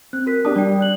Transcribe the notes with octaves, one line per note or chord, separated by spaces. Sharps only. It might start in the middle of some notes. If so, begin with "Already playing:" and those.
C4 F#6
F#4 A#4 B6
B3 D4 G4 A5 D#6
G3 D5 G5
D5 F#6 F#7